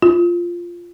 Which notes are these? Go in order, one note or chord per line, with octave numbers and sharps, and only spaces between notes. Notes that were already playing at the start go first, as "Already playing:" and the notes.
F4